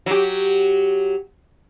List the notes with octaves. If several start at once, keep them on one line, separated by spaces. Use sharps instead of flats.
F#3 G4